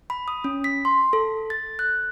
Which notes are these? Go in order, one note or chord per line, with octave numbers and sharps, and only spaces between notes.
B5
D#6
C#4
B6
C6
A4
A6
F#6